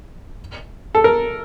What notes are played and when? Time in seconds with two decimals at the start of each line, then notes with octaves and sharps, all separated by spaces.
0.95 A4
1.04 A#4